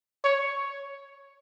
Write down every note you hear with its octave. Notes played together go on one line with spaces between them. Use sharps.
C#5